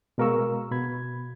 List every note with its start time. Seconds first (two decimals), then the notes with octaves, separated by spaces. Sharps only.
0.18 B2 G#3 A#4 F5 C#6 E6
0.71 B2 B5 G#6